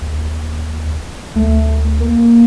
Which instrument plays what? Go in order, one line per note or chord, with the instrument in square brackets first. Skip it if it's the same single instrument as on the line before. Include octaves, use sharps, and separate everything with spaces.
[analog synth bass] D#2
[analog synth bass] D2 [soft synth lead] A3
[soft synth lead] A#3